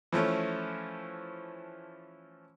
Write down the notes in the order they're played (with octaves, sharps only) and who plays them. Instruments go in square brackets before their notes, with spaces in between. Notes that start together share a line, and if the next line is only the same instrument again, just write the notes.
[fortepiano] E3 F3 A3 C#4